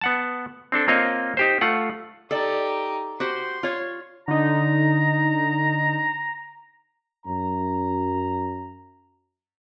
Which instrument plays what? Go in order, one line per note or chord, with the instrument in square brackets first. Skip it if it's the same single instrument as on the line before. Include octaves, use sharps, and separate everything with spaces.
[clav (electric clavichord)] B3 F#5 A5
C4 D4 A4
A#3 C4 F4 C#5 D#5
D#4 G4 C5
A3 F4 F#5
[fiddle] D#4 G4 [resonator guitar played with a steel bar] A4 D5
[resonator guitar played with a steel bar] F#4 G4 C5 [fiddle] C6
[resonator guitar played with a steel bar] F4 C#5
[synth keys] D3 D#4 [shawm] A#5
[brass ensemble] F#2 A#5